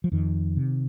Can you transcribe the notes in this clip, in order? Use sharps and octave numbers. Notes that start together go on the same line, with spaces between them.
F3
F2 D#3
C3